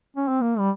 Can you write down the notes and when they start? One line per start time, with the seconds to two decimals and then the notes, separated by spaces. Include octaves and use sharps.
0.16 C#4
0.28 C4
0.41 A#3
0.59 G3